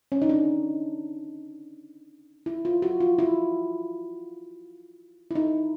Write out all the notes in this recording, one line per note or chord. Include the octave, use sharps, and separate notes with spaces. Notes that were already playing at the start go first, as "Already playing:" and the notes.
C#4
D#4
D4
E4
F4
F#4
F4
E4
E4
D#4